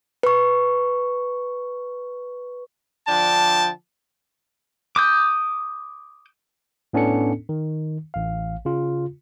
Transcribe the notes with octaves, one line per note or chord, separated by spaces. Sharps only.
B4 C#6
D3 F3 D4 G5 A5
D6 D#6 G6
A2 B3 C#4 D4 A4 C#7
D#3
A1 F5
C#3 F4